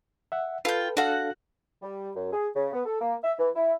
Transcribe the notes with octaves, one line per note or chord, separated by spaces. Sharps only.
E5 F#5
F4 A4 B4 G5
D4 F#4 A4 F5 F#5
G3
F#2
G#4
C#3
B3
A4
A#3
E5
E3
E4